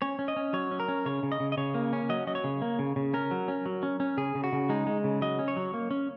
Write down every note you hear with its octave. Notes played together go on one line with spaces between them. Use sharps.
C#4 C#5
C#4
D#5
C#4
F#3 C#5
C#4
A#4
C#4
C#3 C#5
C#3
D#5
C#3
D#5
C#3 C#5
A#3
C#4
F#3 D#5
F#3 D#5
C#5
C#3
A#3
C#3
C#3
C#4 A#4
F#3
C#4
F#3
C#4
C#4
C#3 G#4
C#3
F#4
C#3
G#3 D#4
G#3
C#3
F#3 D#5
C#4
C#5
F#3
A#3
C#4